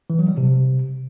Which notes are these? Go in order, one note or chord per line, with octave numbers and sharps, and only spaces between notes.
E3
F#3
G3
C3